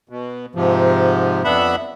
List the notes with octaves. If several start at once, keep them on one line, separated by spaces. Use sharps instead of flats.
B2
G#2 C3 F3
F2 B3 D4 E5 F#5 B5